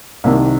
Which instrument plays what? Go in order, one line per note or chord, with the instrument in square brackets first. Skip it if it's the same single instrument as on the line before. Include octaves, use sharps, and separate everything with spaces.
[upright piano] C2 C3 D#3 A#3